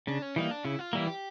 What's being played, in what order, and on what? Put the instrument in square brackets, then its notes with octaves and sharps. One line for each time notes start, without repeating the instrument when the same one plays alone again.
[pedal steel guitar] C#3 [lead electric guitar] D4
[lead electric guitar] C#4
[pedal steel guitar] E3 G3 A#3 [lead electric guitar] D#4
[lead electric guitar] D4
[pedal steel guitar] C#3 [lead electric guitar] E4
[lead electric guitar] F4
[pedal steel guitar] E3 G3 A#3 [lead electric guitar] E4
[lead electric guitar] G4